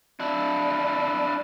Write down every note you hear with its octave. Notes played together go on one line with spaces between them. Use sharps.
D4 E4